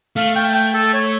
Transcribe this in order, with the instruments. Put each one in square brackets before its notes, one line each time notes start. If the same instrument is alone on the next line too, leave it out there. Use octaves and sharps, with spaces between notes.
[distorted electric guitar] A3 [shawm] F5
[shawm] G5
G5
A4
C#5